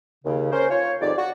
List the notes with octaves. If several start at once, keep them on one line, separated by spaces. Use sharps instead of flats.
D#2 C#3
C#4 A#4 C5
F4 C#5
F2 G#2 D#3 G4 D5
F#4